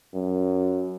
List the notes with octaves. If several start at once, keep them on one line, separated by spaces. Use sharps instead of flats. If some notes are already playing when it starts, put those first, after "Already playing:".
F#2